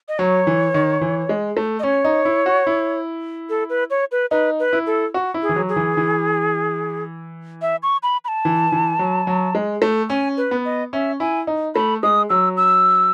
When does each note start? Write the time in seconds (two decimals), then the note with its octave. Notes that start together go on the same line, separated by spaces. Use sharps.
0.08 D#5
0.19 F#3 C#5
0.47 E3
0.74 D#3
1.01 E3
1.29 G#3
1.57 A3
1.79 D#5
1.83 C#4 C#5
2.05 D#4
2.25 E4
2.46 F#4
2.67 E4
3.49 A4
3.70 B4
3.90 C#5
4.12 B4
4.31 D#4 B4
4.59 B4
4.73 E4
4.87 A4
5.14 F#4
5.34 E4
5.42 G#4
5.49 E3
5.56 F#3
5.69 G#4
5.76 E3
5.97 E3
7.62 E5
7.83 C#6
8.03 B5
8.25 B5
8.28 A5
8.45 E3
8.72 E3
8.99 F#3
9.27 F#3
9.55 G#3
9.82 A3
10.09 C#4 G#5
10.37 B4
10.51 B3
10.65 D#5
10.93 C#4 E5
11.20 E4 G#5
11.47 D#4
11.75 A3 B5
12.03 G#3 D#6
12.30 F#3 E6
12.57 E6